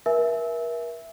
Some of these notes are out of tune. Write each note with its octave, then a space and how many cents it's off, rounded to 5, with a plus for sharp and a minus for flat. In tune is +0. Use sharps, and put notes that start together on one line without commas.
A#4 +40 E5 +0 G#5 +25